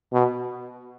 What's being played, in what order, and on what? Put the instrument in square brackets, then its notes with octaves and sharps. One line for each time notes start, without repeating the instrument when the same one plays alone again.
[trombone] B2